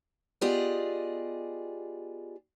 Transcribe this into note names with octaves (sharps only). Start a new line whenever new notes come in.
B3 F4 G4 G#4 D5 D#5